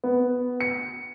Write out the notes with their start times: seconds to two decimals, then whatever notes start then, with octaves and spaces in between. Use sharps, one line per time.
0.04 B3
0.61 C#7